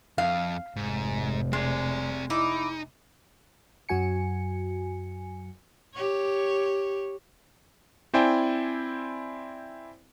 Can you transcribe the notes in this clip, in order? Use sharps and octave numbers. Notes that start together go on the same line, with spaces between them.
F2 F5
F1 G#2
G#3 C4 D5
D#4 E4 D5 D6
F#2 F#3 F#4 G#5 C#7
G4 C#5
C4 E4 C5 D5 G5 G#5